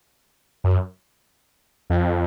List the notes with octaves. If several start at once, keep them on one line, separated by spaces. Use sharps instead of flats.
F#2
F2